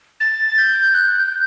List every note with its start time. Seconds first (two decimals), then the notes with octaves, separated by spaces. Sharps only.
0.20 A6
0.58 G6
0.94 F#6
1.19 G6